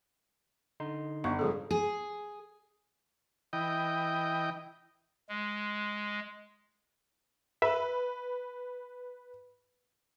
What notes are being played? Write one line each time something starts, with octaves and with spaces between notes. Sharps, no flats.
D3 D#4 C6
G1 C#6
G#2 C#3 F3 G3 G#4 A4
G#4
E3 D#5 G5
G#3
B4 E5